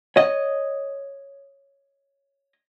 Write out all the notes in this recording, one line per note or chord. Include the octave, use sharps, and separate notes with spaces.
C#5 D#5